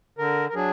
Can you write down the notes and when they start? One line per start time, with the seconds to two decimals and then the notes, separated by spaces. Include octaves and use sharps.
0.18 D3 A#4
0.49 A#4
0.54 F#3 D4 G#4